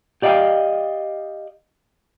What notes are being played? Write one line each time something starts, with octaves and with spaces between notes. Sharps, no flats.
G4 D5 D#5 F5 G5